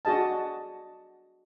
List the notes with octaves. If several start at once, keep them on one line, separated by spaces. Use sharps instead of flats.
D4 F#4 G#4 D#5 A5